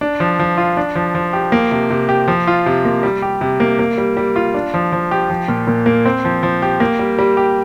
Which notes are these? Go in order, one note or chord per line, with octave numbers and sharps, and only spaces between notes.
D4
F3
F3
F4
D4
F3
F3
G4
A#3
C3
C3
G4
F3
F4
C3
A#3
G3
G4
C3
A#3
A#3
G3
G3
F4
D4
F3
F3
G4
F3
A#2
A#2
A#3
C4
F3
F3
G4
A#3
G3
G3
G4